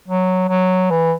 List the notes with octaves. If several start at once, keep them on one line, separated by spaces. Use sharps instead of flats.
F#3
F#3
E3